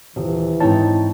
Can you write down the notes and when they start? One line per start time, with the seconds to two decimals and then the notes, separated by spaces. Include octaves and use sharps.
0.16 D#1 E3
0.60 G#2 C4 D#4 E4 C#5 A5